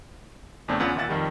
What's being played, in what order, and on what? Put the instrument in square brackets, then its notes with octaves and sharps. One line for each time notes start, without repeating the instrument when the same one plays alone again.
[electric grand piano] E2 C#3 A3 C4 D4
E2 B3 C#4 F4 F#5
D#2 A#2 E5 F#5 A6
F2 D#3 G3